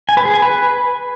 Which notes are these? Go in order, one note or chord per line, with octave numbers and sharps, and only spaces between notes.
G#5
B4
G#4
G#5
B4